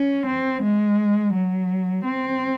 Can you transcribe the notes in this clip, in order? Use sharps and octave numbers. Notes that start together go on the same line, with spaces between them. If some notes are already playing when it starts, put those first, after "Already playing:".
Already playing: C#4
C4
G#3
F#3
C4